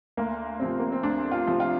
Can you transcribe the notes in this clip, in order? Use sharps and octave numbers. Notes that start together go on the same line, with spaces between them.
D2 A#3
C3 F3 C4
A#3
C4
D2 D4
F4
C3 F3
F4